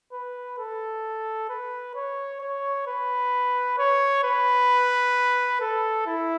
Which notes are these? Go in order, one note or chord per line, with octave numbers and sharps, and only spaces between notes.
B4
A4
B4
C#5
C#5
B4
C#5
B4
A4
E4